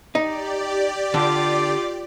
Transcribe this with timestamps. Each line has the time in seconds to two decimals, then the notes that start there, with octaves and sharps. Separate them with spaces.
0.15 D#4 G4 D5
1.14 D3 F4 D6